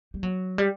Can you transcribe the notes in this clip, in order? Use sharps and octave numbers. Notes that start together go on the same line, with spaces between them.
G3
F#3
G3